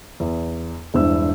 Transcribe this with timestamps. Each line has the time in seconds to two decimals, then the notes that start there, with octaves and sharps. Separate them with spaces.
0.20 E2
0.94 E1 G2 E3 C5 E6